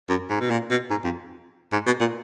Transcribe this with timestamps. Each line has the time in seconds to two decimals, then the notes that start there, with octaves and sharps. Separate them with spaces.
0.09 F#2
0.30 G#2
0.40 B2
0.51 A#2
0.70 B2
0.91 G#2
1.04 F2
1.73 G#2
1.87 B2
2.00 A#2